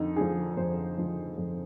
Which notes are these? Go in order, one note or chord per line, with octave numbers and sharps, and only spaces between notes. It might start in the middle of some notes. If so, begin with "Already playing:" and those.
Already playing: F2 D3 D#4
D3 F3 G#4
F2 C5
D3 F3
F2